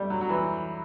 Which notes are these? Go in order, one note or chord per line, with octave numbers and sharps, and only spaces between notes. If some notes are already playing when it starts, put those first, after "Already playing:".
Already playing: G3 A3
F#3
F#3
E3